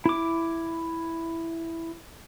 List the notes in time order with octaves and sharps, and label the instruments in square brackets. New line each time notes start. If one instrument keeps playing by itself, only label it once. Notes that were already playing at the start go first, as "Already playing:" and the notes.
[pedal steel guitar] E4 D6